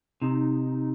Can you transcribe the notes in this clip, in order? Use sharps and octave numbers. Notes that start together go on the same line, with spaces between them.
C3 D#4